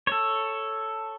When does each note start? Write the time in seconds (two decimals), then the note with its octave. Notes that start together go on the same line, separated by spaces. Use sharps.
0.07 A4 C#5